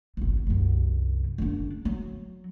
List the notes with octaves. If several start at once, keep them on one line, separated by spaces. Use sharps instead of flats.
G1 C2
C2 F#2
F#1 D4
F#3